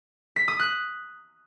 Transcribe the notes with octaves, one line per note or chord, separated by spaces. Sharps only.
B6
D#6
F#6